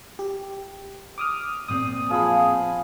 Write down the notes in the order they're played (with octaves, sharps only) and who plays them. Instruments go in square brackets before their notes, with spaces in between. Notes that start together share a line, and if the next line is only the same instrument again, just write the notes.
[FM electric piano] G4
D6 D#6 F6
[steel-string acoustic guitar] A#2 C4 D5 [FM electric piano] D#6
[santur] F3 B5 [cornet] G#4